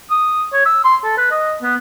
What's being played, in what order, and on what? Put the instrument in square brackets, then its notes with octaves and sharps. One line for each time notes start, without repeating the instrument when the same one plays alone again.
[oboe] D#6
C#5
E6
C6
A4
B4
D#5
B3